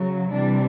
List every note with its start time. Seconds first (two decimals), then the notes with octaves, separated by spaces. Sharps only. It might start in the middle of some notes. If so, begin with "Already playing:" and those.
Already playing: C#3 F#3
0.30 C3 E3 G3 D4